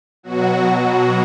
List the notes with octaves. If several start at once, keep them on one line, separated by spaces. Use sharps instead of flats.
B2 F#3 F#4
F#4